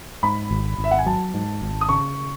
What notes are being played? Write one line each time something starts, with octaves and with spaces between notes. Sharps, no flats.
G#2 B5
G#1
G#1
E5
F#5
G#5
F#3 A5
G#2
G#1
D#6
C#3 C#6